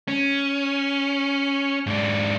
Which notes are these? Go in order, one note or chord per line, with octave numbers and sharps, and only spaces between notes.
C#4
G#2 D4